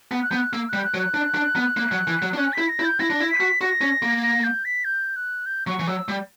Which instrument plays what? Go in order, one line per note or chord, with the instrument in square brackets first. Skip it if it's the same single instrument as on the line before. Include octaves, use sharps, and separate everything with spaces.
[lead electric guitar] B3
[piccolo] F#6
[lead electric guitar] B3 [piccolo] G6
[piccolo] F#6
[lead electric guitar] A#3 [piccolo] E6
[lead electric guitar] G3 [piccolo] F#6
[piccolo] F#6
[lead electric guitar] F#3
[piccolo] F#6
[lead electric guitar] D4
D4
B3
A#3
F#3
E3
F#3
D4
[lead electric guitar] C#4 [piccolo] F#6
[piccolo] B6
[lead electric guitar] E4
[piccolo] A#6
[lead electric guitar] E4
[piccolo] G6
[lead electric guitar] E4 [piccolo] A#6
[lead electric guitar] D4
E4
[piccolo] B6
[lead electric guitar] F#4
[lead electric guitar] F#4 [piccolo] A#6
[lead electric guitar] C#4
A#3
[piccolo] A#6
G6
B6
G6
F#6
G6
[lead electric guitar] F#3 [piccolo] C#6
[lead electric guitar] E3
[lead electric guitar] F#3 [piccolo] E6
[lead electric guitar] G3